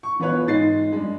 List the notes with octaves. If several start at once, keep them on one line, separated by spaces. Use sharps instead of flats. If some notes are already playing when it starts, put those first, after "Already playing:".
C#6
E3 B3 F4 B4 C#5 F#6
G#2 G#3 D#4 A6 C7
G2 G#3